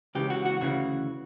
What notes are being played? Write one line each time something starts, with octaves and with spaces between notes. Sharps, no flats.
C#2 C#3 E3 G4
F#4
F#4
D2 C#3 E3 F#4